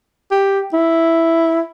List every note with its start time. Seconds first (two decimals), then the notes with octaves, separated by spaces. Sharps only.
0.31 G4
0.73 E4